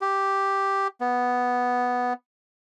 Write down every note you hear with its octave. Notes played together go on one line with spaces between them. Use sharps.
G4
B3